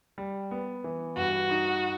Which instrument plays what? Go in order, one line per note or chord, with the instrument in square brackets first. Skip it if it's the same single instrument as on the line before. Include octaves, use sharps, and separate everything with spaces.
[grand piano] G3
B3
E3
[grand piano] G2 [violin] F#4
[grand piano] D#4